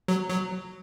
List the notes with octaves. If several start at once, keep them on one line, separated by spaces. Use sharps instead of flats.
F#3
F#3